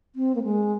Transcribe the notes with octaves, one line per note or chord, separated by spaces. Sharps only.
C4
A#3
G#3